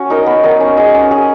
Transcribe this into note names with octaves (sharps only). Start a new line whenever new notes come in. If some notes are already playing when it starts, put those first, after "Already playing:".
Already playing: C#4 F#4
D#4 A#4 D#5
B3
D#4 A#4 D#5
C#4
G#4 D#5
C#4
G#4 D#5